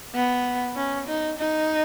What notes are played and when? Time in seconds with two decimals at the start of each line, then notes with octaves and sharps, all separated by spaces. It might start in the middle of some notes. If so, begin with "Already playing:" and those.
0.15 B3
0.76 C#4
1.08 D#4
1.38 D#4